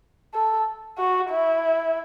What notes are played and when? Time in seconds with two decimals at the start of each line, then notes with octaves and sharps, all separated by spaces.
0.34 A4
0.98 F#4
1.30 E4